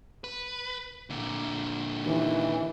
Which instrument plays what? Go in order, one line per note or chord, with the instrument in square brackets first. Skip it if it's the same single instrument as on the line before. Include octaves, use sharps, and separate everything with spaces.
[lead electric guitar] B4
A#2 D3
[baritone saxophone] D#2 [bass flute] E3